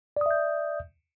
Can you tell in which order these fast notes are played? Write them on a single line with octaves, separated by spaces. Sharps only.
D5 D#6 E5 G6